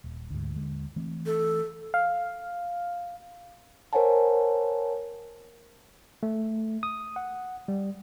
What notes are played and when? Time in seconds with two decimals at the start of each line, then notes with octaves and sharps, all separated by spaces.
0.04 D#1
0.30 D2 G#2
0.55 D#2 D3 G#3
0.96 E3 A3 C4
1.26 A4
1.94 F5
3.93 A#4 C5 C#5 F#5 G#5 A5
6.23 A3
6.83 D#6
7.16 F#5
7.68 G3